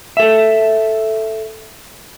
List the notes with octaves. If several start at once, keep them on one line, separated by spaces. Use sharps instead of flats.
A4 E5